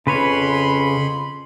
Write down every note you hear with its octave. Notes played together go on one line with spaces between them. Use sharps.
F2 C#3 B4 C#5 B5 C6